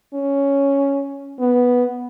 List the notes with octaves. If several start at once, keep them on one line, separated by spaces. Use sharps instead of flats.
C#4
B3